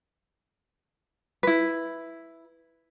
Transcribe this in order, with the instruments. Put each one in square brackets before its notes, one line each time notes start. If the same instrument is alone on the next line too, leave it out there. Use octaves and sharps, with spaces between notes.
[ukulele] E4 B4